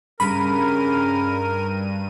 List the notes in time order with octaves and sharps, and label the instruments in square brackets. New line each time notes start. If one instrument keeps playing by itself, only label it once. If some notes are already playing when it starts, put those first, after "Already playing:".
[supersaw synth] G2 D#7 [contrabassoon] C#3 [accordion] A#4 [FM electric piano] B5